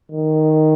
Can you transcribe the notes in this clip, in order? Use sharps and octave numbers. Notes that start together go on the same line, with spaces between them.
D#3